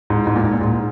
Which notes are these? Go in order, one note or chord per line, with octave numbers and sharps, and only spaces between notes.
G#2
G#2
A#2
G#2
A#2
G#2